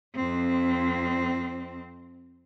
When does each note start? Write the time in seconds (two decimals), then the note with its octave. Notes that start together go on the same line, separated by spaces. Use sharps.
0.15 F2 C4